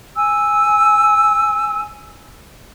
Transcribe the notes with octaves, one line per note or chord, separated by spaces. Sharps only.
G#5 E6